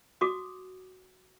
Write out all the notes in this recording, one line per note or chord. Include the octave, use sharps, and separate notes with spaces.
F#4 D6 D#6